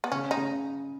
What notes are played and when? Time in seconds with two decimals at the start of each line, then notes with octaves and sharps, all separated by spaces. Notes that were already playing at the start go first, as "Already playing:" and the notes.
0.04 B3
0.12 C#3 C#4
0.31 D#4
0.37 C#3